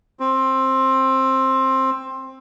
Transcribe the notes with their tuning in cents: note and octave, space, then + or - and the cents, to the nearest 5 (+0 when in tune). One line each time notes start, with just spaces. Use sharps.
C4 +15